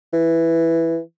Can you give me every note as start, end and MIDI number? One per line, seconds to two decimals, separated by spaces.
0.13 0.99 52